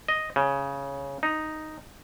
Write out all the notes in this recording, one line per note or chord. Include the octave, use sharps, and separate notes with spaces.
D#5
C#3
D#4